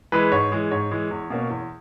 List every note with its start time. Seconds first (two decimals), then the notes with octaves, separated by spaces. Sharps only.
0.12 E3 G#3 B4
0.32 G#2 C#5
0.52 E3 G#3
0.71 G#2 C#5
0.91 E3 G#3
1.11 E2
1.30 B2 A#3 C#4
1.50 E2